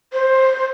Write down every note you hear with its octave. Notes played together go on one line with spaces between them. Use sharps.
C5